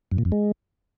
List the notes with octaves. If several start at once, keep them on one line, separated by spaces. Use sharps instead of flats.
F#2
A#2
F2
G#3